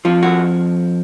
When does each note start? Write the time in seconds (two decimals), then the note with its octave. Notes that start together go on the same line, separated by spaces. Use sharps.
0.05 F2 F3 F4
0.23 F#4